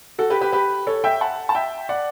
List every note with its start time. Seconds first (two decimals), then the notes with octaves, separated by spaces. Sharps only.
0.18 F#4 A4
0.30 G4 B4
0.41 G4 B4
0.52 G4 B4
0.87 A4 C#5
1.04 E5 G5
1.21 F#5 A5
1.49 A5
1.55 E5 G5
1.89 D5 F#5